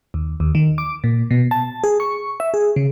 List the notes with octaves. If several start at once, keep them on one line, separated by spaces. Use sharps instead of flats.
D#2
D#2
D#3
D6
A#2
B2
A5
G#4
C#6
E5
G#4
C#3